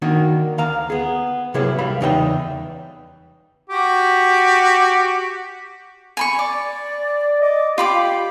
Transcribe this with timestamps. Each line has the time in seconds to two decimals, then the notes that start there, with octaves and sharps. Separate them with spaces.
0.02 D#3 A#3 D4 F#4
0.58 D2 F5 A#5
0.90 B3 G#4
1.54 C3 F#3 A#3 E4 G#4 B4
1.78 C2 G3 F5 B5
2.01 E2 C#3 D#4 B4 E5 G5
3.70 F#4 G4
6.17 G#5 B5 C#6
6.39 D5 D6
7.41 D#5 D6
7.78 F4 G4 B5 D6